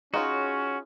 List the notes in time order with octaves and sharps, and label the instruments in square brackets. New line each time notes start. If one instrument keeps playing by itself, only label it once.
[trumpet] C#4 [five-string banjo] D#4 F4 C#5 [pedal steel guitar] F#4 [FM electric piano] G#4